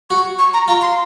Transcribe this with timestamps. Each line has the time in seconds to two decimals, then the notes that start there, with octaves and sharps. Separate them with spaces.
0.10 F#4 C#6
0.39 C#6
0.54 A#5
0.68 F4 A#5
0.82 C6